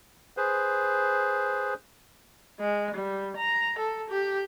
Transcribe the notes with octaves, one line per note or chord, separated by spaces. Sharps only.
G#4 B4 C5
G#3
G3
A#5
A4
G4